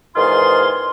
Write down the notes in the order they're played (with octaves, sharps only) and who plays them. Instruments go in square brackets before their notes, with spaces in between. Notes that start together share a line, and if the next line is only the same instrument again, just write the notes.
[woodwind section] E2 G#2 D#3 F4 G#4 C6